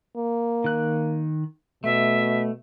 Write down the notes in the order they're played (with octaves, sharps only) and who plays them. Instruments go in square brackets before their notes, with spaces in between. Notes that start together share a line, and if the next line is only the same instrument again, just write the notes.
[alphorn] A#3
[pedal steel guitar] D#3 F#6
[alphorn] B2 [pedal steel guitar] A3 [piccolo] E5